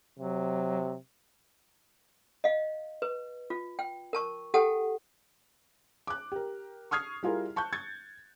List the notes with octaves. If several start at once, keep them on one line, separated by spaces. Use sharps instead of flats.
C3 F#3
D#5 F5
B4
F4
G5
A#4 A5 C#6
G4 A4 F#5 G5 A5
D6 F#6
G4 A#4
C#6 D#6 F6 G#6 C7
G3 E4 F4 G#4 A#4
A5 C#6 F#6 G6
G#6 A6 C#7